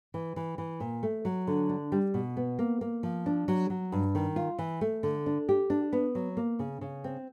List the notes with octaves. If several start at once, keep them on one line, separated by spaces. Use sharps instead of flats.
E3
E3
E3
A#2
A3
F#3
D3
D4
G3
B2
B3
A#3
A#3
F3
D4
F#3
F#3
G2
D#3
F4
E3
A3
D3
D4
G4
D4
B3
F#3
A#3
C#3
C#3
C4